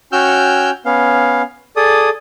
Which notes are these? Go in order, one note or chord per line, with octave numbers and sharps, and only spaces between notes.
C#4 F#4 G5 E6 F6 G6
B3 C#4 F5
G#4 A4 D5 D#6